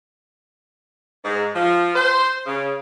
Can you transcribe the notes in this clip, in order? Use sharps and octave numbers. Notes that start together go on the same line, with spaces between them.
G#2
F3
C5
C#3